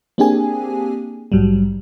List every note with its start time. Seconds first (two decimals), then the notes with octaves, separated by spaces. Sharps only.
0.18 A#3 C4 D4 G4 G#4 G#5
1.32 A#1 G#2 F#3 G3